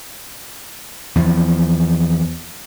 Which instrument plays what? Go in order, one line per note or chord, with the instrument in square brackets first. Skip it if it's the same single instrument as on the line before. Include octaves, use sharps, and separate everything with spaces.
[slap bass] E2 F3